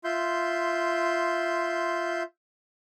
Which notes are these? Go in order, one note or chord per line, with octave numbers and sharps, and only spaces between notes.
F4 E5 C6 G6